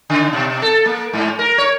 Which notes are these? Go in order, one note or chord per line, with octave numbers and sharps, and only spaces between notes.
C#3
B2
A4
A#3
G#2
A#4
C#5